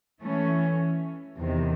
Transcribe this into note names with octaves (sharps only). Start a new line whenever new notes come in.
E3 A3 C#4
E2 C3 D#3